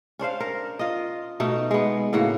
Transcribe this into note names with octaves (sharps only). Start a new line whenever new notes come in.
C#4 D4 C5 F5
A#4
F4 D#5
B2 A3 D#4
G#3 B3
A2 C#3 A#3 F#4